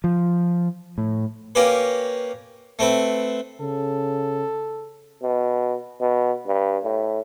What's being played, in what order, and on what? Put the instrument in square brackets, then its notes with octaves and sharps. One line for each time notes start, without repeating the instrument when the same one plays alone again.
[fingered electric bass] F3
A2
[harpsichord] A#3 C#4 G4 B4
A3 C4 B4
[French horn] C#3 [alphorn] A4
[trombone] B2
B2
G2
A2